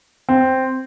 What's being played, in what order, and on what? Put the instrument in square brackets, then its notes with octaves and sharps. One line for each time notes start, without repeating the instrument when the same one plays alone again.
[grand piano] C4